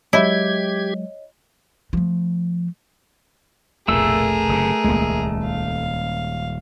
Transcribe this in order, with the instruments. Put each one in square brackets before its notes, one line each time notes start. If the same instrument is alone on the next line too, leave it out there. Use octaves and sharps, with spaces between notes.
[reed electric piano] F#3 G#3 [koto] E4 [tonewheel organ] G4 G#6 [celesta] C#5 D#5 G7
[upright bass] F3 A3
[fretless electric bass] F1 B1 [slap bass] A#2 [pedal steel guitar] A3 E6 [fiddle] G#4 A#4
[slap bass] F#1 C3
[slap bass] D#1 G#3 [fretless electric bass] C#2 A#3
[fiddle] F5